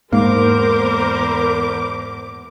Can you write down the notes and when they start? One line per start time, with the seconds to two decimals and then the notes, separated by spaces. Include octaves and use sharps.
0.13 E2 G#2 A#3 A#4 C5 D6